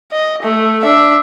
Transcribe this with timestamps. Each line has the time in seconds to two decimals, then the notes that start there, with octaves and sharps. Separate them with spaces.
0.12 D#5
0.42 A3
0.82 D4 E5